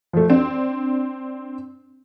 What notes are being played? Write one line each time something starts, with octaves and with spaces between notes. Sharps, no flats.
F3 A3
C4 D4